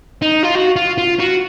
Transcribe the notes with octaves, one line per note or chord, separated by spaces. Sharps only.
D#4
F4
F#4
F4
F4
F#4